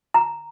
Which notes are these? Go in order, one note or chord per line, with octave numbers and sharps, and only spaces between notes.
A#5